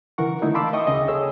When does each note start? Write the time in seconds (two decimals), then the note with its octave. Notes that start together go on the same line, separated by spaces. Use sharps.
0.18 C#3 E3 A#4 F#5 C#6
0.42 D3 A3 D#4 E4
0.54 F5 A5 B5 C6 D6 E6
0.73 D#5 E5 G5 C#6 D#6
0.87 D2 C#3 G#4 D#5
1.08 G#4 A4 C#5 E6